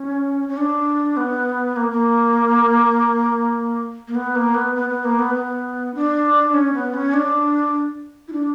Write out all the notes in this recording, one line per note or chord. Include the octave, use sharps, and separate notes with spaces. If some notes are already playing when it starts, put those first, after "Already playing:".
Already playing: C#4
C#4
D4
B3
A#3
A#3
A#3
B3
A#3
B3
B3
B3
A#3
B3
B3
D4
C#4
B3
C#4
D4
E4
D4